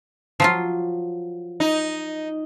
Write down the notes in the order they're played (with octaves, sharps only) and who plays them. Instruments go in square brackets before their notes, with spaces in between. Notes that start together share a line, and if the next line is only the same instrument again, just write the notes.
[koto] F3 F#3 F4
[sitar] D#4